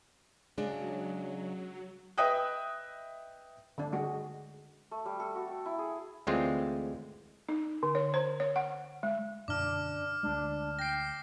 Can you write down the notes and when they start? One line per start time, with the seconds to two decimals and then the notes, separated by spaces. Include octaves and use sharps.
0.58 C#3 F#3 G#3 D4
2.18 B4 D#5 E5 G5 D#6 F#6
3.78 D3 D4
3.92 G#3 F#4 G#4
4.91 A3
5.05 G3
5.20 A4
5.35 F#4
5.48 G5
5.65 E4
5.79 G#4
6.27 D2 D3 E3 G#3 C4 F4
7.49 D#4
7.83 D3
7.95 C#5
8.14 C5
8.40 C#5
8.56 F#5
9.03 G#3
9.48 F#2 B2 D3 D4 D6 F6
10.23 D2 G#3 D4
10.79 G5 A#6 C7